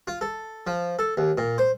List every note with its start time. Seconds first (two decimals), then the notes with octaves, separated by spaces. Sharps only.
0.07 F4
0.21 A4
0.67 F3
0.99 A4
1.17 D#2
1.38 A#2
1.58 C5